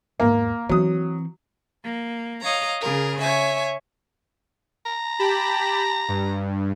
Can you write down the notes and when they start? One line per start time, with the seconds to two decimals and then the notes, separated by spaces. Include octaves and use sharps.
0.20 E2 G#2 A#3
0.69 E3 F#3 C4 D#6
1.83 A#3
2.43 C#5 D#5 F5 A#5
2.81 C#3 G#4 A#4
3.21 C#5 E5 G#5
4.86 A#5
5.19 G4 A5 B5
6.08 G2